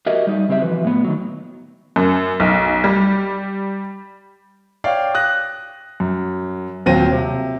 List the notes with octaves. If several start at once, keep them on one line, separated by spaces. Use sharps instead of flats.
F#4 G4 A#4 D#5 E5
G3 D#4
C#3 C4 G4 C5 E5
E3 F3 F#4 B4
A2 B3
D#3 F#3
F#2
B1
G3
C#5 D5 F5 G5
D#6 F#6 A#6
F#2
D#1 F#3 C4 F4 A#6 D#7
C3